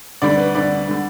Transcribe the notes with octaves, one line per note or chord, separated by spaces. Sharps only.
D2 D3 G3 D5
B4
D2 D3 G3 D5
D3 G3